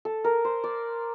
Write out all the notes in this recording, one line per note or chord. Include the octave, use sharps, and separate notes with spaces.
A4
A#4
C5
D5